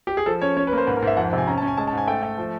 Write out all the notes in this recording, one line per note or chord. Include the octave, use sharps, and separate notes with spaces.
G4
G#4
F3 A4
C#4 C#5
C#4 C#5
B4
A#3
C5
G#2 B4
A#4
G#2
E5
F2 F#5
C3
G#5
C#4 A#5
A5
C#4 G#5
G#3 A5
A5
G#2 G#5
A3 G5
A3
F3